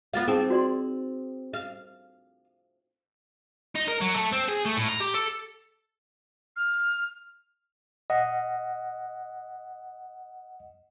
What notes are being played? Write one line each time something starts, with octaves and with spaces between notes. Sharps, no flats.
B3 F4 F5
C4 D#4 G4 G#4
F#4 D5 C6
F5
D#4
A#4
F#3
A3
C4
G#4
A3
A2
A#5
G4
A4
F6
D#5 F#5